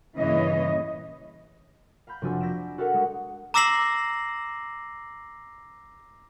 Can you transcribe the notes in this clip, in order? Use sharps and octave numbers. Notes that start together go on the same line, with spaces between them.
G2 A#2 C#3 E3 C#5 D#5
F5 A#5 B5 G6
F1 F3 D4 F#4 G#5 E6
E6 G6 A#6 B6 D7 E7
F#4 A4 A#4 E5 F#5
G#3 D#6
A#5 D6 E6 A#6 C7 F#7